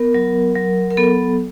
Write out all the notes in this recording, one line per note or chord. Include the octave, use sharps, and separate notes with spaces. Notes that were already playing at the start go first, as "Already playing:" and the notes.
Already playing: B3 A#4
F#3
F#3
A#4
B3 A4